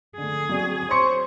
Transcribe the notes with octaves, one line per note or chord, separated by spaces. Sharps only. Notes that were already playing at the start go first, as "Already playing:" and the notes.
D3 A3 G#4
F#3 C4 D5
C5 C#5 C6 C#6 C#7